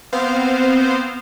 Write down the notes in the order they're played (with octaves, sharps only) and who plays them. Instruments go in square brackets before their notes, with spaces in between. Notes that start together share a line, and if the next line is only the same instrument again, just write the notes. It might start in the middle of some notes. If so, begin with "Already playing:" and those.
[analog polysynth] B3 C4 C5 F5